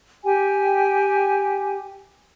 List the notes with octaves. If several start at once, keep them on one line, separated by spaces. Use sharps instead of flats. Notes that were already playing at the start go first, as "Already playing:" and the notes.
G4 G5 G#5